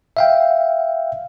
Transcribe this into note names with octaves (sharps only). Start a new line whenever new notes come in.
E5 F5 G5